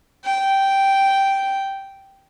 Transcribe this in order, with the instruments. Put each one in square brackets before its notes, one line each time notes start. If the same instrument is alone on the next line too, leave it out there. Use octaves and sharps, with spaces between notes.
[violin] G5